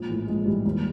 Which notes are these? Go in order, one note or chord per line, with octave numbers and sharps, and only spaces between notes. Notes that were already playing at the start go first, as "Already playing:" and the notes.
Already playing: A#1 G#3
A2 E3
A#1 G#3
A2 E3 G3
D#2 G3